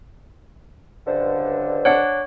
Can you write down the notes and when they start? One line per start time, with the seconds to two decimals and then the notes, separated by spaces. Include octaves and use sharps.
1.07 C#2 G2 D3 C5
1.85 D4 C#5 F#5 F#6